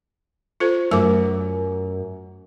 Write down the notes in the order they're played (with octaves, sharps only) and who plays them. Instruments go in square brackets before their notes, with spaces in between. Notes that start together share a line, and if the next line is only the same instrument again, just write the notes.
[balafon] F4 A4 C5
[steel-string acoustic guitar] F#2 [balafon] A3 D6